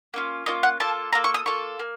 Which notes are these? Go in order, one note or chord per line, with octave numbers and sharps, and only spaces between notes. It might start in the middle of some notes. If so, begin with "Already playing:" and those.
A#3 C#4 F4
A#3 C#4 F4 D#5
F#5
A#3 F4 A4 A5
A#3 F4 A4 A#5
C#6
D#6
A#3 F4 A4 C#6
A#3